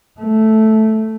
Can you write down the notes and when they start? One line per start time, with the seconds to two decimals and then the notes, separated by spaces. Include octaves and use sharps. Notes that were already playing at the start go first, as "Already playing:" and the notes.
0.20 A3